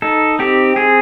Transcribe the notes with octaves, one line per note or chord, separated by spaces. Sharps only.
D#4 A4
C4 G4
C4 G#4